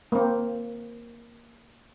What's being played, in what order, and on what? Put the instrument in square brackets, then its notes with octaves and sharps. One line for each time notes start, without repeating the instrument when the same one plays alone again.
[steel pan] A#3 C4